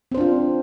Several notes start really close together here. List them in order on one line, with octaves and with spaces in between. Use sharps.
C4 C5 D4 F4